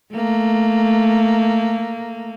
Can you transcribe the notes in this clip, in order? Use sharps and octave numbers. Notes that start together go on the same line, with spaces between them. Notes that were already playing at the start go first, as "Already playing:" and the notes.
A3 A#3